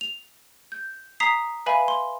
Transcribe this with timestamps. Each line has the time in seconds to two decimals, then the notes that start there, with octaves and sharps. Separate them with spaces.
0.01 F7
0.72 G6
1.20 A#5 D#6 B6 C7
1.66 B4 E5 F5 G#5 B5
1.88 C6